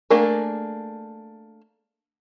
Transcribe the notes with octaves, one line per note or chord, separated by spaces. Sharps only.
A3 A#3 D4 G#4 A#4